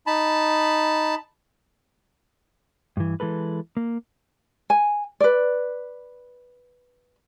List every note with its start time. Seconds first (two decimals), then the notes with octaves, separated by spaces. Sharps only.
0.07 D#4 A5 B5
2.97 G2 E3
3.20 E3 G#3 A4 B4
3.77 A#3
4.70 G#5
5.20 B4 D5